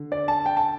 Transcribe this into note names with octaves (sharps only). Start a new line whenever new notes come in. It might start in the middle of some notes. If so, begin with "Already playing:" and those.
Already playing: D3
D5
A5
G5
A5